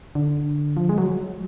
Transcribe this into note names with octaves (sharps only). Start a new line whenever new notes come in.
D3
F3
G#3
F#3